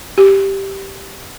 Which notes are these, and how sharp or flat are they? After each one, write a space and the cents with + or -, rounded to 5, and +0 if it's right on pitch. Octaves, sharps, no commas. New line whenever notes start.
G4 -5